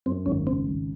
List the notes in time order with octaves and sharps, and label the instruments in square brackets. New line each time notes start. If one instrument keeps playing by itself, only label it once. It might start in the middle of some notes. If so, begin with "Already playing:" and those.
[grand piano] F#2 [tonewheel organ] C4
[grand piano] G#1 [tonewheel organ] C#4
[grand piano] C#3 [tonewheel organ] C4
[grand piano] G#1